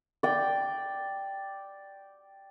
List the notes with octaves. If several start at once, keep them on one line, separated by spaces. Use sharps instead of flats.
D5 G5